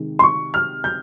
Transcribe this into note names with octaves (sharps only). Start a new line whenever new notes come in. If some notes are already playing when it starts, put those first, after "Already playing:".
Already playing: C3 D#3 G#3
C6
C#6
F6
G6